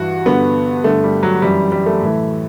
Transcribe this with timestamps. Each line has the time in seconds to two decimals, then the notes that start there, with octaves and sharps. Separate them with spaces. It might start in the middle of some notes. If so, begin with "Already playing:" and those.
Already playing: G2 E3 F#4
0.26 G2 D3 B3
0.84 G2 D3 A3
1.04 G3
1.23 F#3
1.42 F#2 E3 G3
1.72 G3
1.86 A3
2.01 A2 E3